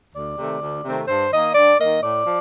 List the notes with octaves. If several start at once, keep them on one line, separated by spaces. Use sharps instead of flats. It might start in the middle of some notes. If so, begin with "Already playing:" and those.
D2 D5
C3 D#3 A3 C4
D2
C3 D#3 A3 C4
G2 C5
D#3 A#3 D#5
G2 D5
D#3 A#3 D#5
A2 D5
F3